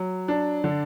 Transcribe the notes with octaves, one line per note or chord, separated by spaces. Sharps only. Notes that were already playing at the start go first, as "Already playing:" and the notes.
Already playing: F#3
D4
D3